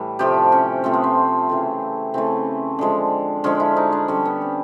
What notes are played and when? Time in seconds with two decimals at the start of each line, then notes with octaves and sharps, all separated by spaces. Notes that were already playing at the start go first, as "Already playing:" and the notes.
Already playing: A2 E3 G3 E4
0.19 C3 F3 A3 G4
0.52 C#4
0.84 C3 F3 A3 C4
0.94 B3
1.04 C4
1.49 C#3 E3 A3
2.14 C#3 E3 A3 C4
2.79 D3 F3 G#3
3.44 D3 F3 G#3 C#4
3.60 E4
3.76 D#4
3.92 D4
4.08 D3 G3 C#4
4.25 B3
4.42 C4